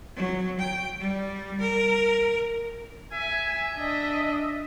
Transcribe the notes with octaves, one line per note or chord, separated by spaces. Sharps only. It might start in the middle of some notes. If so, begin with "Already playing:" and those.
F#3
G5
G3
A#4
E5 G#5
D4 D#5